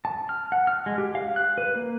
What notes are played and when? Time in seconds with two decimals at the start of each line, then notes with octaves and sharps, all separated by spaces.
0.05 A5
0.29 F6
0.52 F#5
0.67 F6
0.86 G#3
0.98 G4
1.15 F5
1.36 F#6
1.58 B4
1.75 A#3